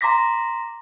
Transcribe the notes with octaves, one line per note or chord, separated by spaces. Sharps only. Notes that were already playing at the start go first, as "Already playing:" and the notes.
A#5 C6 D6 A#6 B6